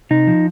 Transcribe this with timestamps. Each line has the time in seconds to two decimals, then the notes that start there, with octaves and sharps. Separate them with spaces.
0.10 C3 D#4
0.27 F3